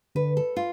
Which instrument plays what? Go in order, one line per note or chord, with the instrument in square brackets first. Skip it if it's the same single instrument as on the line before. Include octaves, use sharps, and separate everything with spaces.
[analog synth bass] D3 [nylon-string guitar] B4
[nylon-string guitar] A4
F4